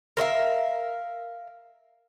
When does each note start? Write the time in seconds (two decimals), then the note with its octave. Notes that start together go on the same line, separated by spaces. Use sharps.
0.17 A#4 C5 E5 F5